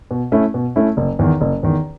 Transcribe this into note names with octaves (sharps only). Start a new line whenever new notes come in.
B2
A3 C#4 E4
B2
A3 C#4 E4
F#1
E2 D#3
F#1
E2 D#3